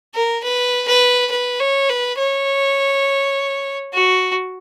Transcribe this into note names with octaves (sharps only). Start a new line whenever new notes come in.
A#4
B4
B4
B4
C#5
B4
C#5
F#4